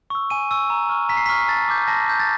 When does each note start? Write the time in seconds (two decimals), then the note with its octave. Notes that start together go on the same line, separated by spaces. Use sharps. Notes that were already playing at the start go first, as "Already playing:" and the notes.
0.10 C#6 E6
0.30 G#5 D#7
0.51 C#6 E6
0.70 A#5
0.89 C#6 F6
1.09 A#5 B6
1.17 C7
1.26 B6
1.29 C#6 F6
1.49 A5 A6
1.69 D6 G6
1.87 A5 A#6
2.07 D6 G6
2.20 A6